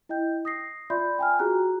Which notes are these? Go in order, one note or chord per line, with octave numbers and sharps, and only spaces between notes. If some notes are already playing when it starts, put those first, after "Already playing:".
E4 D#5 G5 G6
D#6 A#6 C7
F4 D5 E5 B5 C6 G6
G5 G#5 F6
F4 F#4 G#4 A#5 F#6